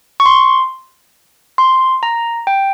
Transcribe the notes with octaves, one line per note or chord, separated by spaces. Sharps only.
C#6
C6
C6
A#5
G5